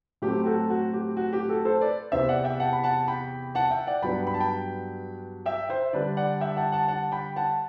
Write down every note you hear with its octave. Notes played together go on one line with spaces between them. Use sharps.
A2 F#3 A3 C4 G4
F#4 A4
F#4
G4
F#4
G4
F#4 A4
A4 C5
B4 D5
E2 C3 E3 C5 E5
D5 F#5
E5 G5
F#5 A5
B5
F#5 A5
G5 B5
F#5 A5
E5 G5
D5 F#5
G2 F#3 B3 D4 G5 B5
B5
A5
G5 B5
E5 G5
C5 E5
D3 G3 D4 B4 D5
D5 F#5
E5 G5
F#5 A5
F#5 A5
F#5 A5
G5 B5
F#5 A5